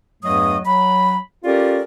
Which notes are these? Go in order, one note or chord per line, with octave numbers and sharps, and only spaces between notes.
E2 G2 F#3 A3 D#5 D#6
F#3 B5
C#4 F4 G4 A4 A#4 D5